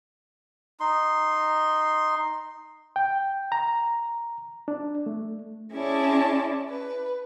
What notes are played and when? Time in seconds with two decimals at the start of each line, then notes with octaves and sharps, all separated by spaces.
0.80 D#4 C6
2.96 G5
3.52 A#5
4.68 D4
5.06 A3
5.73 C#4 E4 G#4 D5 A5
6.69 B4